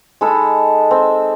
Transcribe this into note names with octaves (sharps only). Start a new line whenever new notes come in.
G#3 D#4 A4 B5
C4